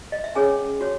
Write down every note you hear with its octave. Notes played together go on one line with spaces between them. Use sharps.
D#5
E5
C#4 G#4 C#5 G#5
F#4 C#5